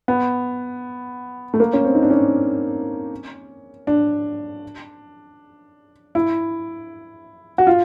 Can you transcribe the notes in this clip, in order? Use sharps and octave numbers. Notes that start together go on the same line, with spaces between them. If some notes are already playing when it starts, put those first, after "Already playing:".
B3
A3
A#3
C#4
C4
D#4
D4
C#4
D4
E4
F#4
F4